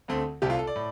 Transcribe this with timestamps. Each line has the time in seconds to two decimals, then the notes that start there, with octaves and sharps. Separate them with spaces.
0.08 D2 D3 A3 C4
0.42 C2 C3 A3 G4
0.50 F4
0.59 A4
0.67 D5
0.76 A2